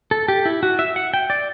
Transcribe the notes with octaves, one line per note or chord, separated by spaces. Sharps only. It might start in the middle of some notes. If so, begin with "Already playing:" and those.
A4
G4
E4
F#4
E5
F#5
G5
D5